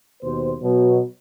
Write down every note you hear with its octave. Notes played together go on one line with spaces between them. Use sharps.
D#2 B2 C5
B2 F#3